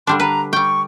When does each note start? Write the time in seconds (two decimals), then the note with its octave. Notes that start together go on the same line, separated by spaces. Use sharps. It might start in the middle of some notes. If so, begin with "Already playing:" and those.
0.07 D3 G3 D4 C6
0.20 B4 A#5
0.53 G3 G5 C#6